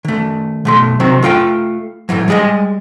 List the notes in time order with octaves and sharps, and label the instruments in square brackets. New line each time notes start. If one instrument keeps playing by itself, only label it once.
[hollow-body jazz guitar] D#3 A3
B1 A3 C6
C3 D#3 F#3 C4
A3 F4 D5 G5
A2 C3 E3 F#3
G3 G#3 G#4 A#4 D#5